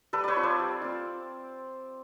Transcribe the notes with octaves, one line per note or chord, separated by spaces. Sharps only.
G3 A4 B4
B4 C#5 D5
C4 F4
C5 D5
G3
C4 F4